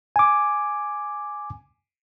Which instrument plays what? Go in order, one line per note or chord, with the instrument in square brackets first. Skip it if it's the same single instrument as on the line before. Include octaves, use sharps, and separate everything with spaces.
[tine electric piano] G#5 D6